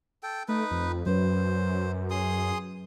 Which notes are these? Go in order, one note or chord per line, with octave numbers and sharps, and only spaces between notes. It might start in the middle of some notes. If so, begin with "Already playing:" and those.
A4 G5
A3 D#4 B4
F2
F#2 F#3 C#4 B4 C5
G#4 C6 D#6